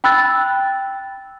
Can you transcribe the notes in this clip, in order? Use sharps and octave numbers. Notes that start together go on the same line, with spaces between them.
G5 B5 E6 F#6 A6